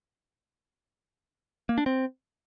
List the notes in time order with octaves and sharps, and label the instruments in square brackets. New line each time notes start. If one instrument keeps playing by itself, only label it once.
[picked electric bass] A#3
D4
C4